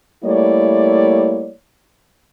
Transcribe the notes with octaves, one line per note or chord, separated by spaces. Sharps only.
G3 A3 A#3 E4 C#5 D5